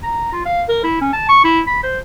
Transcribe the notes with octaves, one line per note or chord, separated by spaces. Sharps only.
A#5
F4
F5
A#4
E4
C#4
A5
C#6
E4
B5
C5